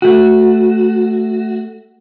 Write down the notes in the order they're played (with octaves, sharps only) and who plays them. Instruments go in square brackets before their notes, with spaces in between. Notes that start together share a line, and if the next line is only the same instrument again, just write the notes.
[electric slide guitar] A3 F#4